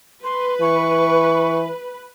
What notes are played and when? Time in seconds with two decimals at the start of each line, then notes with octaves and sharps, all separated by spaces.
0.24 B4 C6
0.61 E3 C#6